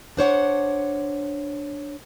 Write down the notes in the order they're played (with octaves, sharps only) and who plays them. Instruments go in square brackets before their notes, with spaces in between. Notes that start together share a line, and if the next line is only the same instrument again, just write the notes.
[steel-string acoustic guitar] D4 C5 C#5 F#5